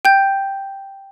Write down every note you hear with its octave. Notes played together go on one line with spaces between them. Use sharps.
G5 G6